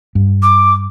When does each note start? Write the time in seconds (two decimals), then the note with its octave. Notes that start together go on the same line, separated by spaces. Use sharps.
0.15 G2
0.42 D6